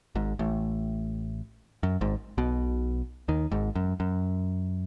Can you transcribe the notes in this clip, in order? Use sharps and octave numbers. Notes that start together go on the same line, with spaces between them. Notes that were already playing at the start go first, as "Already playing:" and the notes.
G#1 G#2
A1 A2
F#2
G#1 G#2
B1 B2
D#2 D#3
G#1 G#2
F#2
F#2